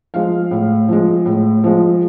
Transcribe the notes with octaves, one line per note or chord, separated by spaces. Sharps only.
F3 G#3 F5
A2
F3 G#3
A2
F3 G#3